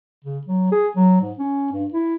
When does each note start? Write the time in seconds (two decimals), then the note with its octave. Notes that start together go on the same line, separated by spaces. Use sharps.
0.24 C#3
0.46 F#3
0.72 G#4
0.96 F#3
1.21 G#2
1.38 C#4
1.72 G2
1.93 E4